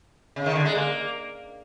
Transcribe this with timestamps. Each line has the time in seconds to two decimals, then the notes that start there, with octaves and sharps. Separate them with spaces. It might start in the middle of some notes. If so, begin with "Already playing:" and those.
0.36 C#3
0.46 D#3
0.56 D3
0.65 G#3
0.75 A#3